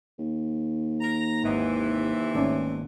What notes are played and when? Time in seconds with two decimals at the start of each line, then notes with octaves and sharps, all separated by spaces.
0.18 D#2
1.01 A#5
1.44 G#1 C3 E3 D#5 F#5
2.35 G#1 A3 C#4 D5